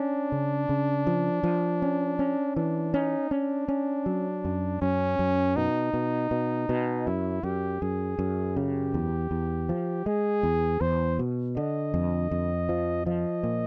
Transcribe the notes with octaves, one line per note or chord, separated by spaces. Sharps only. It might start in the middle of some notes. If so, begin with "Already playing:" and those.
Already playing: C#4 D4
C#3
C#3
F3
F3
C#4
C#4
E3 D4
C#4 D#4
C#4 D4
C#4
F#3
F#2
F#2 C#4
F#2
B2 D#4
B2
B2
B2
F#2 E4
F#2 G4
F#2 G#4
F#2
C#3 G4
E2
E2
F3
G#3 G#4
E2
E2 C5
B2
D3 D#5
F2
F2
F3
F3 D#5
A#2